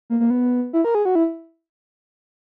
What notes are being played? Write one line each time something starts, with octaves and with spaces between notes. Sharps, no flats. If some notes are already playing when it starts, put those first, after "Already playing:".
A#3
A#3
B3
E4
A#4
G#4
F#4
E4